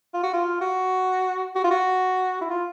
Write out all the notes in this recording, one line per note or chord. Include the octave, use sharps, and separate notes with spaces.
F4
F#4
F4
F#4
F#4
F4
F#4
E4
F4